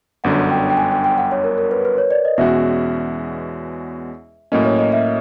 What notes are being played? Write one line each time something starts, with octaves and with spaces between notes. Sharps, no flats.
G1 F#2 D3 F#5
G5
G5
G#5
G5
G5
F#5
C#5
A#4
A#4
B4
B4
C#5
D5
D#5
E2 B2 G#3 C#4 F#4 E5
A2 F#3 A#3 C#4 D#5
C#5
D#5
E5